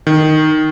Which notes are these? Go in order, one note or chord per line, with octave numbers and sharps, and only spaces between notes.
D#3